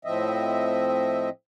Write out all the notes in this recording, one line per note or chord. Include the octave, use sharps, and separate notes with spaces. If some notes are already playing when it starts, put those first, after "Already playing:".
A2 F3 C4 D#5 E5